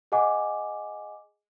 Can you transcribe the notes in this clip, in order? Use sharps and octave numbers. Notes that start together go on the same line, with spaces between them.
G#4 D#5 F#5 G#5 D6